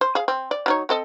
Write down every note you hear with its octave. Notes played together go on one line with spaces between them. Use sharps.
C5
G#4 F5
C4
D5
F#3 D#4 C#5
C4 A4 D#5